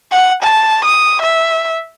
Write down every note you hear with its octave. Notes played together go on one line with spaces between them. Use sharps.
F#5
A5
D#6
E5